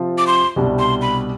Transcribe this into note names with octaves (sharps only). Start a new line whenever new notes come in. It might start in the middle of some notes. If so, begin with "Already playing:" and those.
Already playing: C3 F3 C4 F4
D6
C6
C2 B2 G3 D4
C6
B5